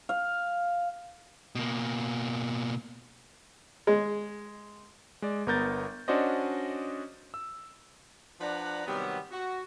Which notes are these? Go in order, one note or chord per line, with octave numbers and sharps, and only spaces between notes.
F5
B2 A#3
G#3
G#3 D5
G1 B3 A#4 G6 A6
C#4 D4 F#4 C5 D5 D#5
E6
F3 D4 B4 D5 F#5 A#5
C3 D#3 F#3 G3 B3
F#4